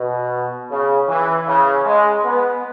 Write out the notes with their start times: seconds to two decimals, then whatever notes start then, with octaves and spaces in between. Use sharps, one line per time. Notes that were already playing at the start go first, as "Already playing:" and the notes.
Already playing: B2
0.70 C#3
1.08 E3
1.47 C#3
1.86 G#3
2.24 B3